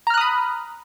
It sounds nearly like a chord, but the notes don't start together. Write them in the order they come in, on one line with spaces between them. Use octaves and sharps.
A#5 F6 F#6 D#6 B5